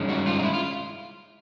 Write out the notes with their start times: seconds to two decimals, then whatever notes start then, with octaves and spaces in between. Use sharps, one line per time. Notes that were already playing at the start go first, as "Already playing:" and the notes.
Already playing: G2 D#3 G#3 C#4
0.09 F#4
0.26 F4
0.39 D#4
0.43 E4
0.54 F4